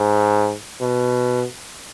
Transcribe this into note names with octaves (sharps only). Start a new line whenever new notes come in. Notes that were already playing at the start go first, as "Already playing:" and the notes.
Already playing: G#2
B2